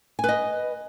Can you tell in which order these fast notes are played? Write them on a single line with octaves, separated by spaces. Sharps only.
G#5 B4 D#5